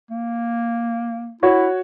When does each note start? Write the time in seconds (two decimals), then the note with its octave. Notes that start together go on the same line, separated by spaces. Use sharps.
0.11 A#3
1.43 E4 F#4 C#5 F#5